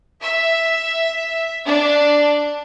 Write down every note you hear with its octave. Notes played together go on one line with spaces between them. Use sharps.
E5
D4